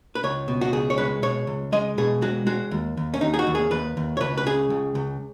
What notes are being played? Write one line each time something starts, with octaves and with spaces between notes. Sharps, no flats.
B4
C#2 C#5
B2
F#4
C#2 G#4
C#5
G#3 B4
B2 C#5
C#2
G#3 D#5
B2 G#4
G#3 F#4
G#3 F#4
D#2
D#2
C#4
D#2 D#4
G#4
F#4
D#2
G#4
D#2 B4
D#2
C#5
C#2 B4
B4
C#3 G#4
C#2
C#2